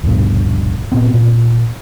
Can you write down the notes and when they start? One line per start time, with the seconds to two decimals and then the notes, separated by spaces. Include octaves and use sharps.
0.03 D1 A#1 G2 B2
0.92 A#2 B3 C4
1.14 A#2